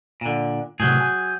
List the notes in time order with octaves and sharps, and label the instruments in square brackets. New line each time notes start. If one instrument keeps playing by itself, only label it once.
[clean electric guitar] A#2 D3
[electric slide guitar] A2 C3 [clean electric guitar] F#3 G#4 [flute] G6
[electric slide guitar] G#5